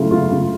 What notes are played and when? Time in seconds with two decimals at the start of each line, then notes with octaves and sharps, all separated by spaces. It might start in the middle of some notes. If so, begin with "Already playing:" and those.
Already playing: C#3 F#3 A3 E4 F4
0.11 C#3 F4
0.31 C#3